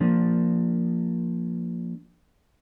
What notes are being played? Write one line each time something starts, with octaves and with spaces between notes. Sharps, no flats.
F3 A#3 D4